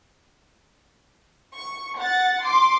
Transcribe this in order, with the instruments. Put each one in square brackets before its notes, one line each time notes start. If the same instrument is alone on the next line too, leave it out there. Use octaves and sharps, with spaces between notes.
[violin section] C#6
F#5 A6
C6 D6